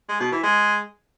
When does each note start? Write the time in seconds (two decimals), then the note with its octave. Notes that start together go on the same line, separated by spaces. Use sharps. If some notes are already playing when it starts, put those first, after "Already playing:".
0.09 G#3
0.20 B2
0.32 E3
0.43 G#3